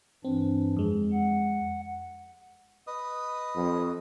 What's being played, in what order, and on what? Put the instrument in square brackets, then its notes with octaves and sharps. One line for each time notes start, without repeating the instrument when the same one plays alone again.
[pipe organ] G2 E3 D4 [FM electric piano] C4
[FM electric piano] F2 G#3
[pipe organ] F#5
[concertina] B4 D#5 D#6
[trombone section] F2